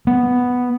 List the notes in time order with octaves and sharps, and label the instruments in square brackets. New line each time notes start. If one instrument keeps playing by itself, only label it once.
[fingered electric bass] B3